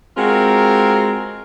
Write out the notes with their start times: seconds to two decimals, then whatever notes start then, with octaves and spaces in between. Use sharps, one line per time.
0.17 G#3 C4 F4 F#4 A#4